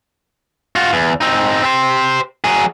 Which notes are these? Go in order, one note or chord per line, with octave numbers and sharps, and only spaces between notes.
F4 F#4
E2
C4 D#4
G4 C5
F#3 G#4